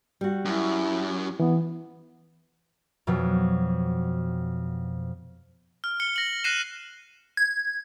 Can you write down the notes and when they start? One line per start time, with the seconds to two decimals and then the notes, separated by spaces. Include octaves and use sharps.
0.21 G3 F#4
0.45 F#2 E4
1.40 E3 B3
3.07 F2 B2 F#3
5.84 F6
6.00 F6 C#7 G7
6.16 A#6 F#7
6.44 F#6 A#6 C7 D#7 E7
7.37 G#6